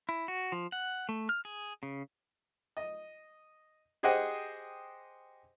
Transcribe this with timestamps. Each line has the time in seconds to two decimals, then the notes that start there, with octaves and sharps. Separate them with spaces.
0.09 E4
0.28 F#4
0.52 F3
0.72 F#5
1.09 A3
1.29 F6
1.45 G#4
1.83 C#3
2.77 D#5
4.03 G4 G#4 C5 D#5 F#5 G5